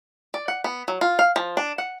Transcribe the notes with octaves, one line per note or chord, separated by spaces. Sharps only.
D5
F#5
B3
F#3
F4
F5
F3
D4
F#5